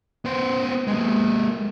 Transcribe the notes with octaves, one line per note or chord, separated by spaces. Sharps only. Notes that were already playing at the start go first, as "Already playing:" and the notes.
B3 C5
G#3 A#3